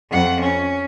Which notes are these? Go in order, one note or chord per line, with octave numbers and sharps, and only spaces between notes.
F2 F#5
C#4